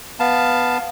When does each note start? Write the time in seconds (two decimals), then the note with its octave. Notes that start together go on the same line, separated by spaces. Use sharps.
0.20 B3 F5 A5